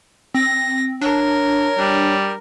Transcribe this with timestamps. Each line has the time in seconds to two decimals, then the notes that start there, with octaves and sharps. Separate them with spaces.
0.35 C4 A#6
1.01 D4 A#4 C#5
1.79 G3 D4